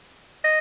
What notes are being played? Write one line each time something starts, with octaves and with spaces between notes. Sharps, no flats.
D#5